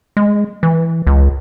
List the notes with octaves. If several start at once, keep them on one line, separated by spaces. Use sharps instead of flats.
G#3
E3
C#2